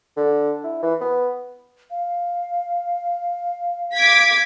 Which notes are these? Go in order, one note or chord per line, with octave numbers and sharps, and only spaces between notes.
D3
E4
E3
B3
F5
D6 G#6 B6